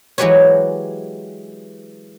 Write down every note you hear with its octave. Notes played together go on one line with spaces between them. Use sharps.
E3 F#3 G#3 G4 B4 C#5